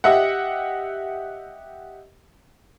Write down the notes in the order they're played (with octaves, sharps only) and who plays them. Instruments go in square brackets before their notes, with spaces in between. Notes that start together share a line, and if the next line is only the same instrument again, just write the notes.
[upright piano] G4 D#5 E5 F#5